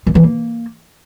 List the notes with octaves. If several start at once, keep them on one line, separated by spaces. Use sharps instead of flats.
D#3
E3
A#3